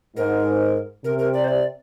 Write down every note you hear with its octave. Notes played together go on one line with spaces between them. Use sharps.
G#2 A#4
C3 A#4
A#4
D5
C5
D5